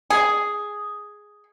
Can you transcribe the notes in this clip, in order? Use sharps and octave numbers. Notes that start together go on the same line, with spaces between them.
G#4